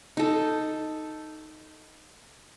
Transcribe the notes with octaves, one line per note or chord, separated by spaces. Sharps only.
D#4 A4